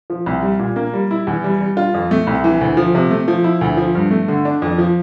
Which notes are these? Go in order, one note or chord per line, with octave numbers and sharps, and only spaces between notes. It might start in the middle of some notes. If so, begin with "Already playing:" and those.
F3
C2
G3
A#2
A#3
G3
E4
E2
G3
G3
F4
F2
A3
C2
E3
D2
F3
C3
A3
F3
E4
D2
F3
G2
A3
D3
D4
F2
F3